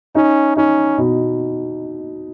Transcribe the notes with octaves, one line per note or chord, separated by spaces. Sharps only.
C#4 D#4
C#4 D#4
B2